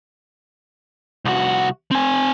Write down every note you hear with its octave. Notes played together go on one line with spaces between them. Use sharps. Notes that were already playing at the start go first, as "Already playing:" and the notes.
C2 F#4
C4 G#5